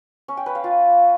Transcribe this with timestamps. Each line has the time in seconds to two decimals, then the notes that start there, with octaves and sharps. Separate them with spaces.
0.28 C#4
0.37 G5
0.46 B4
0.55 F5
0.64 F4